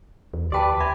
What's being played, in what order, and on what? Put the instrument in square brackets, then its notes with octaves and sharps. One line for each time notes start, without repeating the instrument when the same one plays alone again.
[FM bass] E2
[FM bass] D2 [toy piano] G4 G5 A5 [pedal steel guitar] B4 D5
[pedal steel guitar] C5 G#5 [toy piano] E5 B5